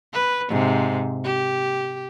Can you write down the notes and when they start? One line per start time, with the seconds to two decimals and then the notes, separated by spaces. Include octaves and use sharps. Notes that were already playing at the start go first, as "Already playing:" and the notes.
0.13 B4
0.49 G#2 C3
1.24 G4